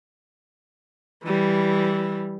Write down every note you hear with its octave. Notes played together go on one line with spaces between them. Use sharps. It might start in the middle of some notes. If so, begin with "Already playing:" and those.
E3 G3